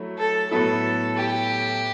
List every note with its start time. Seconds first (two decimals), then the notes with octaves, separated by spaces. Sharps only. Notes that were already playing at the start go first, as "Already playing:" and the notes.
Already playing: F#3 A3 E4
0.18 A4
0.51 A2 F#3 B3 E4 A4
1.17 G4